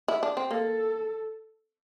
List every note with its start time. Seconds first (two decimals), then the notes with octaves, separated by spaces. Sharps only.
0.08 E4
0.23 D4
0.37 C4
0.49 A#3 A4